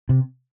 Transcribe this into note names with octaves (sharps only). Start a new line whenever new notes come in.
C3